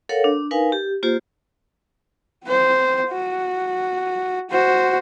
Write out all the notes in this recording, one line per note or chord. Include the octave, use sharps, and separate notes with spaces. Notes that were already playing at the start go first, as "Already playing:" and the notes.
A4 A#4 C#5 F5 F#5
D4
D#4 A#4 B4 F5 G#5
G4
A#3 F4 G4 C5
C4 C5
F#4
F#4 C5